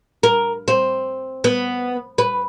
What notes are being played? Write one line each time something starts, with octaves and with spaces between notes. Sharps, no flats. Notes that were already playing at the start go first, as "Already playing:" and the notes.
A#4
C4
B3
B4